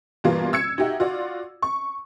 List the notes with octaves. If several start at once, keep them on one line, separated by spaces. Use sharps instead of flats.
G2 B2 E3 G3 A#3 F4
E6 G#6 C#7
D#4 F#4 G4 E5 F#5
F4 F#4 D5
C#6